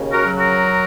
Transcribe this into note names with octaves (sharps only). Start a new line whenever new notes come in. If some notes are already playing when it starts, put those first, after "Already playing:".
Already playing: D#2 C#3
F#4 A#4
F#3
F#4 A#4